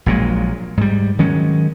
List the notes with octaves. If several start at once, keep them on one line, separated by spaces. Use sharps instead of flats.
A#1 A#2 F#3 G#3
G#2 G3
D#3 F#3 G#3 C#4